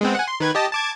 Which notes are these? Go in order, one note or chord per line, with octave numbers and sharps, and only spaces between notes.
G#3 B3 C4
F#5 G#5
C6
D#3 B4 G#6
G4 D#5 A5
A5 D6 G#6